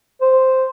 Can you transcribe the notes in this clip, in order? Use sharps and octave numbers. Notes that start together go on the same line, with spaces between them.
C5